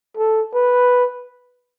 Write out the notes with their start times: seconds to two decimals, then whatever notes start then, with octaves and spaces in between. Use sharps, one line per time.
0.17 A4
0.54 B4